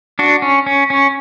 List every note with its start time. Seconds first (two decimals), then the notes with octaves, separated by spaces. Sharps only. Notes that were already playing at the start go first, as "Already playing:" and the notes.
0.19 D4 F#4
0.42 C#4
0.66 C#4
0.90 C#4